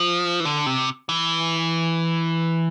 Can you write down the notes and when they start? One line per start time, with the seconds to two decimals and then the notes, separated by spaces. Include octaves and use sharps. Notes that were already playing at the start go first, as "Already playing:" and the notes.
Already playing: F3
0.40 E3
0.45 D3
0.66 C3
1.09 E3